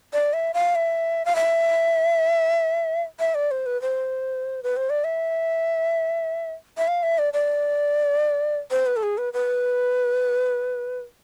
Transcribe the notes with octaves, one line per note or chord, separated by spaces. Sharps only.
D5
E5
F5
E5
F5
E5
E5
D5
C5
B4
C5
B4
C5
D5
E5
E5
F5
E5
D5
D5
C5
B4
A4
G#4
B4
B4